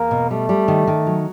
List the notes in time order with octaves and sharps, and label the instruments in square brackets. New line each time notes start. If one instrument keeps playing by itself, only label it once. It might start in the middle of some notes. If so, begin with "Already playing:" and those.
Already playing: [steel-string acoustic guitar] E2 [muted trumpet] A#3
[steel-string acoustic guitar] B2
[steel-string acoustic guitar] G3 [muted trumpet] A3
[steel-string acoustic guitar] G3
D#3
D#3
F#3